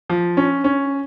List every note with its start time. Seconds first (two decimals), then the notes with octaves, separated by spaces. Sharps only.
0.09 F3
0.37 C#4
0.64 C#4